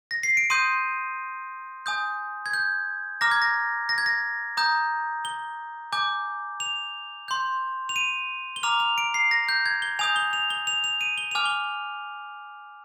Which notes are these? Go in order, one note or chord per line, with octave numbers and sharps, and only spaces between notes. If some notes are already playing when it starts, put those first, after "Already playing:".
A#6
C7
D7
C6 D#6 G6 D#7
G#5 D#6 G6
G#6
G6
A#5 D6 F6 A#6
G#6
A#6
A#6
G#6
A#6
A#5 D#6 G6
G7
G#5 D6 G6
F7
C6 G6
F7
D#7
G7
A#5 D6 F6 F7
F7
D7
C7
A#6
G6
G#6
G7
G#5 D#6 G6 F7
G7
F7
G7
F7
F7
D#7
G7
G#5 D6 F6 F7
G7